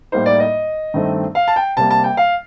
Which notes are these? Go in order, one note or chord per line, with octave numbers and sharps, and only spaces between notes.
A2 G3 A#3 D#4 C5
D5
D#5
G2 D#3 A3 C4
F5
A5
G5
C3 G3 A#3 A5
A5
G5
F5